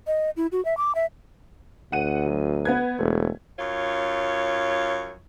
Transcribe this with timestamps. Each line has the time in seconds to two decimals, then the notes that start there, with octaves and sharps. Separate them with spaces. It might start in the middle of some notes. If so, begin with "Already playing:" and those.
0.07 D#5
0.36 E4
0.52 F#4
0.65 E5
0.77 D6
0.95 E5
1.92 D2 F#5 D#7
2.26 F#3
2.65 B3 B4 G#6
2.99 E1 A3
3.59 F#2 F4 C#5